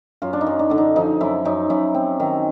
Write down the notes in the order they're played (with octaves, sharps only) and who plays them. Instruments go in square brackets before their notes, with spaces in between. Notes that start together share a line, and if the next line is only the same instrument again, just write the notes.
[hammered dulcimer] F#2 F4
D4
D#4
F#2
D4
D3 D4
D#4
F3 D#4
F#2 E4
F#2 D#4
F#2 E4
C4
D#3